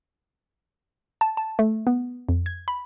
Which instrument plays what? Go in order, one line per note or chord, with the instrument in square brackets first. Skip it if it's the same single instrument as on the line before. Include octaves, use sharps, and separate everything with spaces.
[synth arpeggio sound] A5
A5
A3
B3
F2
G#6
B5